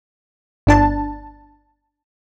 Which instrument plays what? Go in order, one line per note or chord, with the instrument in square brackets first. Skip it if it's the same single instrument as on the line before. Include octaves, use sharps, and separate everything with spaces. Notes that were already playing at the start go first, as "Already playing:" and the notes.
[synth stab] G1 D4 A5